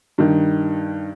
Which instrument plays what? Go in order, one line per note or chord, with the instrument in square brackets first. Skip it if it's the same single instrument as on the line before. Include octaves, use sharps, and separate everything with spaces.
[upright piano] G2 D#3